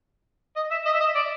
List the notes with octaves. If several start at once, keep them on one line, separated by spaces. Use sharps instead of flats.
D#5
E5
D#5
E5
D#5
D5